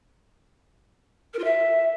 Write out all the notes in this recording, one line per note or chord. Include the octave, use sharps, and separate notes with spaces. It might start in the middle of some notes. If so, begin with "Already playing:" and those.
A#4
F4
E5